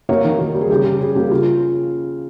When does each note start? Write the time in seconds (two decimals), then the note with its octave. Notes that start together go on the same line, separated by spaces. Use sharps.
0.09 A#3 C#5
0.24 D#3
0.39 A#3
0.54 G3
0.61 G#4
0.70 C#3 G4
0.85 C#3
1.01 G3 G#4
1.15 A#3 G4
1.31 C#3 F4